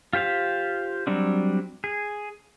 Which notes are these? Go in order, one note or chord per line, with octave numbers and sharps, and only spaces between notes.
F4 G4 C5 F5
F#3 G3 C4 D4
G#4